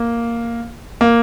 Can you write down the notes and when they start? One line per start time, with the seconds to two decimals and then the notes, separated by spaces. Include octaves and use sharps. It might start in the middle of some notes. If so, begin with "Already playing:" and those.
Already playing: A#3
1.01 A#3